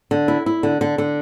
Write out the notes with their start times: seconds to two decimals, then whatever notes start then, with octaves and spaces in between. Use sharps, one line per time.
0.11 D3
0.28 E4
0.46 E4
0.63 D3
0.81 D3
0.98 D3